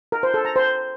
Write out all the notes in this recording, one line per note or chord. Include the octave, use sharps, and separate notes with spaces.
A#4
C5
A4
A#5
C5